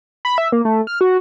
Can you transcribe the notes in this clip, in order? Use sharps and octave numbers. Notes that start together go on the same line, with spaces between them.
B5
E5
A#3
A3
F6
F#4